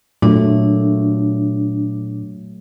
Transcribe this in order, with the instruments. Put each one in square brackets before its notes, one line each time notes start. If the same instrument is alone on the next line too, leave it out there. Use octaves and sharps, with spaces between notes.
[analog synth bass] A#2 [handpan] F#3 A3 [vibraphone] D4